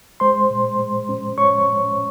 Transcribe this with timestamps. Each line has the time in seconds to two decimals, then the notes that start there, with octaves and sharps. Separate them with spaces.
0.20 G#3 C5 C6
0.50 A#2
0.80 G#3
1.09 C#4
1.38 C#4 C#5 C#6
1.68 C#4